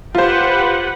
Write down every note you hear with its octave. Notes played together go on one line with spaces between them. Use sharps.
F4 G4 B4 C5 F#5